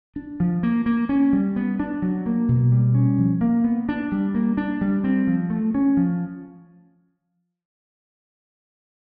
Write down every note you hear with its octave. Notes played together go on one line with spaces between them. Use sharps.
D4
F3
A#3
A#3
C#4
G3
B3
D4
F#3
A#3
B2
G3
C#4
F3
A#3
B3
D4
G3
A#3
D4
G3
C4
F3
A3
C#4
F3